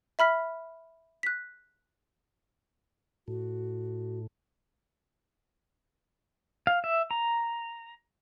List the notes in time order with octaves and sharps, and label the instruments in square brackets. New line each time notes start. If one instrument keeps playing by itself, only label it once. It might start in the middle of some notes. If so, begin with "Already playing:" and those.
[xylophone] E5 B5 F6 B6
F#6 B6
[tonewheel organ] A2 [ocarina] F#4
[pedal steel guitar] F5
E5
A#5